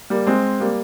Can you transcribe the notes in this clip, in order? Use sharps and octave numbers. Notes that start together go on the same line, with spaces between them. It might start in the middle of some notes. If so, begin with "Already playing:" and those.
G3 A#3
G#3 C4
G3 A#3